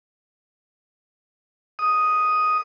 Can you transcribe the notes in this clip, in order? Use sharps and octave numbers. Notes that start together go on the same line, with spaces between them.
D#6